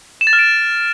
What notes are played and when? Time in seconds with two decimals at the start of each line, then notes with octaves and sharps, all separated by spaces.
0.21 E7
0.27 A6
0.33 F6
0.39 D7